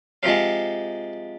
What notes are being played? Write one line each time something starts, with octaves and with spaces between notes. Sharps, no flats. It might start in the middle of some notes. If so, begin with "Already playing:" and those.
C3 F3 G#3 F5